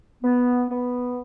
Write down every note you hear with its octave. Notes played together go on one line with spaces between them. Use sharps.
B3
B3